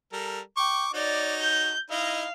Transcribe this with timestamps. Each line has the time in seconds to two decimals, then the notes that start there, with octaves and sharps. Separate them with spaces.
0.13 G3 A4 A#4
0.57 G5 C#6 D6
0.94 D#4 F#4 C#5 D5
1.41 G6
1.90 D#4 E4 D#5 F5